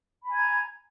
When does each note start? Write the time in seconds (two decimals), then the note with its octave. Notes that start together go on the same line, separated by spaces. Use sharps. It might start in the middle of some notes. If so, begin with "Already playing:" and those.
0.24 B5
0.28 G#5
0.33 G#6
0.37 A#5